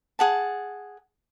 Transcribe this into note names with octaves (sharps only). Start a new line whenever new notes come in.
G#4 F#5 A5